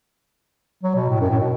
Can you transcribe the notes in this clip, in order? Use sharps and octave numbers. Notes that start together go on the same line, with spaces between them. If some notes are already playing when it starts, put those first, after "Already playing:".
F#3
B2
A2
F#2
A2
B2